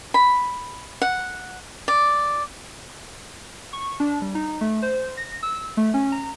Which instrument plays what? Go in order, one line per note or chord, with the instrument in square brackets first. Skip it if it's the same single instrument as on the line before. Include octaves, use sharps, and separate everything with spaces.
[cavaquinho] B5
F#5
D5
[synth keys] C#6
D4
G3
D#4
A3
C5
A#6
E6
A3
C#4
A#5